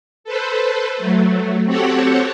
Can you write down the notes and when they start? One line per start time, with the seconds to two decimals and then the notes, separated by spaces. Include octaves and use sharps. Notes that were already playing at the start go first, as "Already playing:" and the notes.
0.24 A4 B4 C5
0.97 F#3 A3
1.65 C4 F#4 G4 A4 C#5 F#5